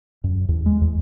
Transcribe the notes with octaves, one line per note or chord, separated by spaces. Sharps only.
F#2
E2
G#3
E2